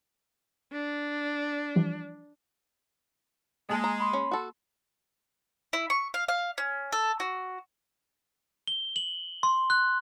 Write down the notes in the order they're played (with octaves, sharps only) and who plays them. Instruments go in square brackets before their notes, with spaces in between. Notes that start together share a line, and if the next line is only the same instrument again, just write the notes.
[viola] D4
[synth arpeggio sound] E3 F3 G3
[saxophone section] G#3 [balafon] A#3 G#5 A5
[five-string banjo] A#5
[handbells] B5 C6
[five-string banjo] C#4
F#4 A4
[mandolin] E4
C#6
F5
F5
C#4
A4
F#4
[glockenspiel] G7
F#7
C6
F#6